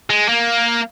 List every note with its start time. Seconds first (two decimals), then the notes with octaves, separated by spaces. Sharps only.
0.10 G#3
0.29 A#3